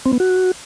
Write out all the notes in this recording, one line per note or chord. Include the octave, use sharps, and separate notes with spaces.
C4
B3
F#4